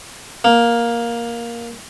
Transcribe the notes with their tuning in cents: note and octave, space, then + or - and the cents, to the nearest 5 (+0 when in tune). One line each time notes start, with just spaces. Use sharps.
A#3 +10